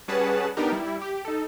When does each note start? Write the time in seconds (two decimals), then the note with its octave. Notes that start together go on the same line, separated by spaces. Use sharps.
0.08 G3 C#4 G#4 B4 F#5 A5
0.57 B3 D4 D#4 G4 A#4
0.72 G3 E4
1.02 G4
1.25 D#4 A4